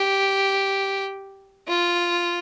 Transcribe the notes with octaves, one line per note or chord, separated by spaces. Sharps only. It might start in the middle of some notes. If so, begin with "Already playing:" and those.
Already playing: G4
F4